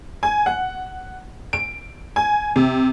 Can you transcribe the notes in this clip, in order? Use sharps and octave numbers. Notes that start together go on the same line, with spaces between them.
G#5
F#5
D7
G#5
C3